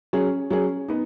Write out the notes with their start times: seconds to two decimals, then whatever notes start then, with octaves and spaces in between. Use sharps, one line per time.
0.13 F#3 C#4 G#4
0.50 F#3 C#4 G#4
0.88 B3 D#4